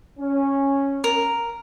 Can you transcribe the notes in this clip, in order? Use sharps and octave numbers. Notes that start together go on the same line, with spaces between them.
C#4
A#4